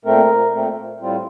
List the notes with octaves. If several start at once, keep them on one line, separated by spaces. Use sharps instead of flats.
A#2 A3 C4 A#4
A#2 A3 C4
A2 G3 C4 F4